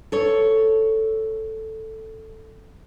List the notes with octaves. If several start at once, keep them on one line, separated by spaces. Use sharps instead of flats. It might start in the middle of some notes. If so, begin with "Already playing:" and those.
A4 C#5